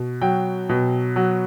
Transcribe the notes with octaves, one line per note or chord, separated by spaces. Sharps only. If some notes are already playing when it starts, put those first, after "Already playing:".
Already playing: B2
F#3 G5
B2
F#3